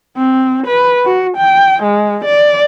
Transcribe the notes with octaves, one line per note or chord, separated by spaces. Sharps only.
C4
B4
F#4
G5
G#3
D5